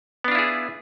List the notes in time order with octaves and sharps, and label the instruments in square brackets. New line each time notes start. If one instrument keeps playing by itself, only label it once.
[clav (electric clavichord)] B3
D4
F4
E4
G#4